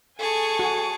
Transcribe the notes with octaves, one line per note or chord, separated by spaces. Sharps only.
G#4 A4 G#5 A5 C#6
F#4